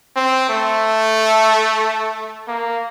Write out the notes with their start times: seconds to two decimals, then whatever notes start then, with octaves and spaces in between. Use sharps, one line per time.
0.16 C4
0.49 A3
2.48 A#3